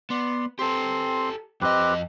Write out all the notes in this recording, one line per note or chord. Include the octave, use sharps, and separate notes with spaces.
B3 D5 C6
C4 G4 A4 C6
F2 C4 G4 B4 D#5